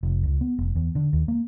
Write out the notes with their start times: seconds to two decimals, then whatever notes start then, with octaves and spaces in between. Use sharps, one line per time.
0.03 F1
0.23 C#2
0.41 B3
0.58 F1
0.76 E2
0.95 D3
1.13 D#2
1.28 A#3